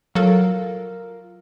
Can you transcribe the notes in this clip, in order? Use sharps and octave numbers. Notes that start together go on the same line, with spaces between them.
F#3 F4 A4 A#4 F5